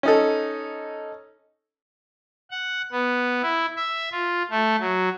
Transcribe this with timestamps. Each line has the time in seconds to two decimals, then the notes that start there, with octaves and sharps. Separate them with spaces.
0.03 C#4 D#4 A4
2.51 F#5
2.92 B3
3.42 E4
3.76 E5
4.11 F4
4.51 A3
4.80 F#3